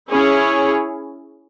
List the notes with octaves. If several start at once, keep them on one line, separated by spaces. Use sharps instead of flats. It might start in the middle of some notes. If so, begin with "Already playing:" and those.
C#4 E4 G#4 C#5